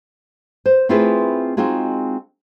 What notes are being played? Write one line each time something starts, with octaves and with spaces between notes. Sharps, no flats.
C5
A3 C4 E4 F4 G#4 B4
G#3 C4 D#4 F4 F#4 G#4